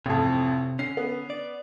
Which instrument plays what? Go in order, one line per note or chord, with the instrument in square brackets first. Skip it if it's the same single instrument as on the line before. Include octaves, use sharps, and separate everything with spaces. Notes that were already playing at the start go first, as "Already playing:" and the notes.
[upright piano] A1 F2 [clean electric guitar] C3
[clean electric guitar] D3 C#4 [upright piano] C7
[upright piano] B3
[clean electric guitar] D5